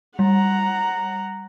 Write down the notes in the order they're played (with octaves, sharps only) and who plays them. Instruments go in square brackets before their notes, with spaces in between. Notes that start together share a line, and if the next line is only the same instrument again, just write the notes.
[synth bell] G3 [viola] F#5 A#5